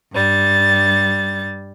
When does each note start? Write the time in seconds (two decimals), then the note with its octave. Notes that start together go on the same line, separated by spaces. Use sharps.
0.12 G2 G3 A6